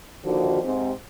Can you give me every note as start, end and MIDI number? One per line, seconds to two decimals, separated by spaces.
0.25 0.60 39
0.25 0.60 50
0.25 0.60 51
0.25 0.60 53
0.25 0.60 66
0.64 0.91 44
0.64 0.91 48
0.64 0.91 60